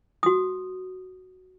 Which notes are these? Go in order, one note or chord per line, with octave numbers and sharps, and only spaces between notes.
F#4 D#6